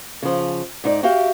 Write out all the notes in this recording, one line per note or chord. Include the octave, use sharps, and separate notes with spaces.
C#3 F3
G#2 D#4 D5
F#4 G4 E5 F5 G5